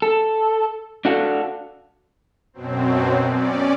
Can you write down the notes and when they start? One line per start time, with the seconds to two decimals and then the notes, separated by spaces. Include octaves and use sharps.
0.02 A4
1.05 D4 F#4 A4 F5
2.53 F#2 B2 F#3 C4
3.27 C#4 D5